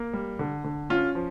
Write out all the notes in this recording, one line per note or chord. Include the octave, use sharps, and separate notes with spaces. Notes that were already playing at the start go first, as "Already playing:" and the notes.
Already playing: A#3
G3
D3
D3
C#4 F4
F3